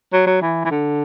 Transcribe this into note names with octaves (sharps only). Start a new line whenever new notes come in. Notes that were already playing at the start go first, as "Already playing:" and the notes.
F#3
F#3
E3
E3
D3